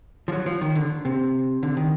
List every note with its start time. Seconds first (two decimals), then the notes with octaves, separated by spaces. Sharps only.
0.28 F3
0.32 F#3
0.46 F3
0.61 D#3
0.75 D3
1.05 C3
1.63 D3
1.77 D#3